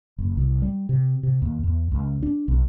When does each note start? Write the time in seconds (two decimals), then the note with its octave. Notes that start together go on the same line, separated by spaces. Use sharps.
0.18 F#1
0.37 C2
0.62 G3
0.89 C3
1.23 C3
1.42 D#2
1.64 E2
1.91 C#2
2.23 D4
2.48 B1